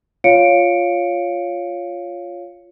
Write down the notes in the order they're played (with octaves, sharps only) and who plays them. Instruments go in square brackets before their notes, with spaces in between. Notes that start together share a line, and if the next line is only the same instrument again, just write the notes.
[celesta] F4 C#5 F5 C#7 D7